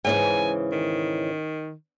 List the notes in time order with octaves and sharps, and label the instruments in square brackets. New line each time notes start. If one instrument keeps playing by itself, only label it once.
[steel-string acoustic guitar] G#2 C#3 E3 [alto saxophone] G#5
[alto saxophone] D#3